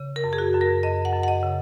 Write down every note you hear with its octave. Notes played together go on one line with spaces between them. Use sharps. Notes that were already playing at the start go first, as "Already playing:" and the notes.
Already playing: C#3
A#4
F#2
G#4
F#4
F#2
A#4
F#2 D#5
F#5
F#2
F#5
D#5
C#3